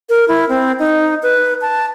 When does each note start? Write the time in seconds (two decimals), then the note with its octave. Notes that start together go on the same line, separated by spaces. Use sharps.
0.09 A#4
0.28 E4
0.49 C4
0.79 D#4
1.23 B4
1.61 A5